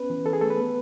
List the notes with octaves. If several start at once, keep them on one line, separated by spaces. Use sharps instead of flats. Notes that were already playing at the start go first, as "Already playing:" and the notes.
Already playing: B3 C#4 B4
E3
E3 A4
G#4
A3 A4
B4
B3